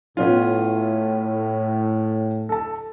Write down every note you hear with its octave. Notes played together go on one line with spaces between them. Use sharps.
A2 B3 C#4 F4
A4 A5